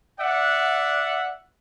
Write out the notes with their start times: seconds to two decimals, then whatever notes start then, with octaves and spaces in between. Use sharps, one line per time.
0.20 D5 E5 F#5